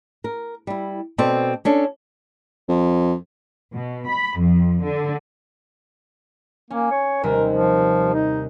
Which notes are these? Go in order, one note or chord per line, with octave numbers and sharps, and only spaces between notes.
A#4
G3 E4
B2 C4 A4 C5 D5
C#4 D4 A4
F2
B2
B5
F2
D3
A#3 C#4
C#5
D#2 C3 G3 A#4
F3
D#4